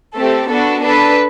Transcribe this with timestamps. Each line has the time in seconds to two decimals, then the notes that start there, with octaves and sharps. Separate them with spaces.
0.16 A3 C4 G4 A4
0.49 B3 D4 F#4 A4
0.84 D4 A4 B4